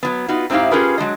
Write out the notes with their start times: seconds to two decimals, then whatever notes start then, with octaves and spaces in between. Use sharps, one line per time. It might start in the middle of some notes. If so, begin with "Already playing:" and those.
0.03 F#3 B3
0.28 B3 D#4 F4 F#4
0.50 G#2 C4 D#4 E4 G4 F5
0.71 C#4 F4 G4 G#4 A#4 B4
0.98 F#3 G#3 D4 D#5